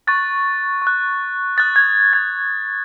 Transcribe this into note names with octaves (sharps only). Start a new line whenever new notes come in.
C#6 F#6 A6
C#6 F#6
D#6 F#6 A6
G#6
G#6